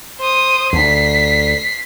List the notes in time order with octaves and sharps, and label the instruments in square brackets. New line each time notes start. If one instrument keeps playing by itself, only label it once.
[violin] C5 D#6
[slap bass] D2 [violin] B6 C7